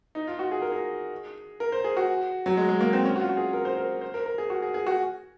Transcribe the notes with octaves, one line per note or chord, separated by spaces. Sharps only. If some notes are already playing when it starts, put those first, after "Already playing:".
D#4
F4
F#4
G#4
A#4
G#4
A#4
C5
G#4
F#4
F#3
G#3
G#3
A#3
C4
C#4
F#4
F4
F#4
G#4
A#4
C5
A#4
C5
A#4
A#4
G#4
F#4
G#4
G#4
F#4